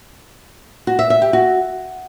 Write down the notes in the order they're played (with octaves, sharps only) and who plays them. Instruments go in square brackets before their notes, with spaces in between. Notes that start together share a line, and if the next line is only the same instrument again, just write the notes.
[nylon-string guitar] F#4
E5
E5
G4
F#4